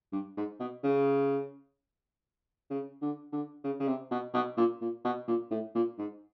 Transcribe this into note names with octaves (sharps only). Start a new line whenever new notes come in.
G2
G#2
B2
C#3
C#3
D3
D3
C#3
C#3
C3
B2
B2
A#2
A#2
B2
A#2
A2
A#2
G#2